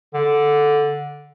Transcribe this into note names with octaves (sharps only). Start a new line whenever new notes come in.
D3